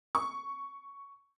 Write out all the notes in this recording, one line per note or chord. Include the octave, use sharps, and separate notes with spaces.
C#6